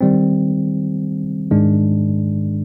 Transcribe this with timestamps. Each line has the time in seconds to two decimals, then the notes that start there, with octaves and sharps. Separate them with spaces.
0.01 D#3 G3 C4
1.51 G#2 D#3 G#3 D4